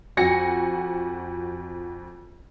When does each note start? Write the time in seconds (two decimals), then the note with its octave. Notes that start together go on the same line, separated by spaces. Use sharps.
0.17 F2 F#4 G#5 A#6 C#7